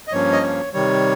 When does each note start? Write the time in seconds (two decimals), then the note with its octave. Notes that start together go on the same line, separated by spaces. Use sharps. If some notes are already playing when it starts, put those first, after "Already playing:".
0.08 D#5
0.12 G2 F3 A#3 C#4 C#5
0.32 D#5
0.43 C#5
0.73 C3 D#3 G3 C#5